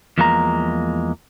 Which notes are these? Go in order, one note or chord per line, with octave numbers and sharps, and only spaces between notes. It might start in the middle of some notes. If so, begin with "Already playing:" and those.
E2 F3 G#3 A#3 C#5 A#5